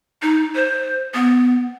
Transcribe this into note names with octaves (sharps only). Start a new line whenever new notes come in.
D#4
C5
B3